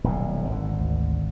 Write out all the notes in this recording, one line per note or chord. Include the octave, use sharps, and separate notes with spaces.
D#1 B1 A2
G#1 D3
D2